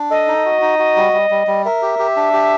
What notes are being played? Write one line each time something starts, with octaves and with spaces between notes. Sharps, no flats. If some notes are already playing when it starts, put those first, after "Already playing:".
Already playing: D4
A4 D#5
D#4
F#4
D#4
F#4
G3
G3
G3
G3
A#4 E5
G4
G4
D4
G4